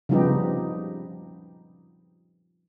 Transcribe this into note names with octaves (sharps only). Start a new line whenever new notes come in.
C#3 F3 G3 B3 D#4 G4